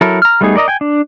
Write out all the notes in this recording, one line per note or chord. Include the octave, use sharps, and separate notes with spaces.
F#3 E4 A4 A#4
A#5 F6
G3 A3 B3 D#4 G#4
A#4 D5 D#5 A#5
G5 G#5
D4